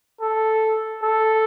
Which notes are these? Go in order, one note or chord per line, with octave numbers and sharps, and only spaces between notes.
A4
A4